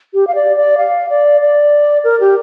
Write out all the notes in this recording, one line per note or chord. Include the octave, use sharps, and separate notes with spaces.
G4
F5
D5
D5
F5
D5
D5
A#4
G4